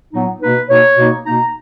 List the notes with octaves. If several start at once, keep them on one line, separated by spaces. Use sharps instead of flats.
A#2 F#3 B3 D#4
B2 A#3 D#4 B4
B2 A#3 D#4 C#5
B2 A#3 D#4
B2 A#3 D#4 A#5